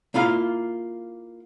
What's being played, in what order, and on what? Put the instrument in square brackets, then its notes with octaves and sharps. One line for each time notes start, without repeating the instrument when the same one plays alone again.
[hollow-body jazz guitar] A#3 E4 F4 F5